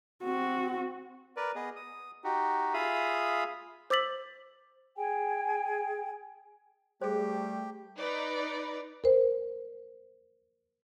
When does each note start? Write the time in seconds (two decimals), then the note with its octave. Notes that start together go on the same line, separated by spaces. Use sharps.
0.23 C4 F#4
1.37 A#4 B4 D5
1.55 B3 G#4 D#5
1.76 D#6
2.24 D#4 F#4 G4
2.74 F4 G#4 E5 F5 B5 D#6
3.90 C5 D6 E6 A6 B6 F#7
4.97 G#4 G5 G#5
7.01 G3 A3 G4 G#4 C5
7.99 D#4 B4 D5
9.04 A#4 C5